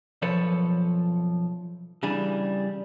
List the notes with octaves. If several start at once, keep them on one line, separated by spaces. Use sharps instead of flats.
B1 F#2 F3 A4 B4 C#5
C#3 E3 G3 D4 G#4